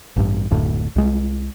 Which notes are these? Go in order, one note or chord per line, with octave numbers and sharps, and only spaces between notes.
A1 G2
F#1 D2 A2
C2 G#3